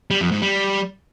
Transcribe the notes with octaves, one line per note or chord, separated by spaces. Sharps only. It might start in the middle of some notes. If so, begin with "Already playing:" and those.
G3
F2
G#2
G3